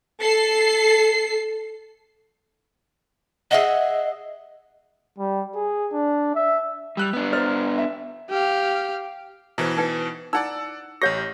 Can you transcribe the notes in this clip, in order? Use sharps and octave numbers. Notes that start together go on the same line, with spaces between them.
A4 C7
G#4 D#5 E5 F#5
G3
G#4
D4
E5
G3 E6 F#6 F7
B3 D4
C5 F6 A6
E5
G4 F5
B2 E3 E4 C5
D#4 B4 G5
D#4 E4 D5 F#5 E6
A1 G4 C#5 F#5 G6 A#6